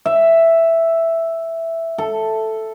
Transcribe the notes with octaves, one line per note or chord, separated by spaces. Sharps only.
E5
A4